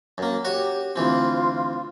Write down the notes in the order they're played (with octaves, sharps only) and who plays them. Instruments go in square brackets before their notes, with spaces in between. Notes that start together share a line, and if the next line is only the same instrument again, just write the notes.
[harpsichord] F#2 A#3
[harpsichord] F#4 C#5 [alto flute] G4
[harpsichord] D2 E3 C4 [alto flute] F4